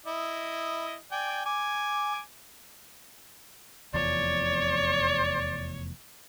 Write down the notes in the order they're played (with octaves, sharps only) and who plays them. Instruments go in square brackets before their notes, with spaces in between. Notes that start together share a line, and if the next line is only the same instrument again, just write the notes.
[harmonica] E4 D#5
D5 G5 G#5
G#5 D6
[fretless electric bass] F1 E2 F3 [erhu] C#5 [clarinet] D5